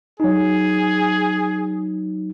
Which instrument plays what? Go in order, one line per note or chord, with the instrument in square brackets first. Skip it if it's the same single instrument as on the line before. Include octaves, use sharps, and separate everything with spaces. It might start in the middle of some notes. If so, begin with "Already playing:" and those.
[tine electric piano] F#3 D#4 [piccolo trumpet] G#4